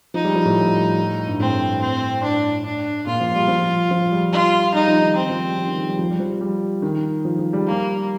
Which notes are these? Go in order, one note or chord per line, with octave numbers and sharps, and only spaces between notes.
F3 D#4
G3
F3
A2
G2
A2 C4
C4
D4
D4
A#2 F4
F3
G3
F3
F3
G3
F4
G3 D#4
F3
D#3
D#3 C4
F3
G3
F3
D#3
F3
G3
F3
G3
F3
G3
D#3
F3
F3
G3
G3 A#3